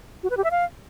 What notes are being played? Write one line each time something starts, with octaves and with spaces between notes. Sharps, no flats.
F#4
B4
G4
E5
F5